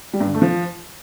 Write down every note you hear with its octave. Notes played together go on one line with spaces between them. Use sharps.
G3
G2
D3
A3
F3